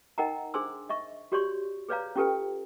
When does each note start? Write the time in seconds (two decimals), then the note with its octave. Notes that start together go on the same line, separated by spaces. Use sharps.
0.18 D#4 A#4 D#5 F#5 G5 A#5
0.54 D4 G#4 C5 G#5 C6 E6
0.89 D#5 E5 C#6
1.32 F#4 G4 C#5 D5 C6 C#6
1.89 G#4 B4 C#5 D5 F5 A#5
2.16 C#4 F4 G4 A4 B4 G5